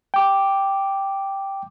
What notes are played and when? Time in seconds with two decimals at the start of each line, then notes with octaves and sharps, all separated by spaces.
0.14 G5 D6